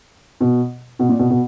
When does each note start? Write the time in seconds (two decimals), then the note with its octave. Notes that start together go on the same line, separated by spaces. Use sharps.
0.40 B2
0.99 B2
1.09 A#2
1.19 B2
1.30 B2